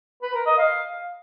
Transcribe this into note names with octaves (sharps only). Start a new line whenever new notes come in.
B4
A#4
D#5
F5